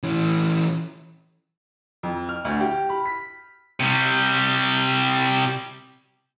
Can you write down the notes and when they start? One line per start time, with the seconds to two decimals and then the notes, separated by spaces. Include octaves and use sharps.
0.03 E3 C#4
2.03 F2
2.29 F6
2.45 D2
2.61 G4
2.89 B5
3.05 B6
3.80 C3 G3